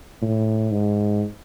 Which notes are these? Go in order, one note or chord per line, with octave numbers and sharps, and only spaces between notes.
A2
G#2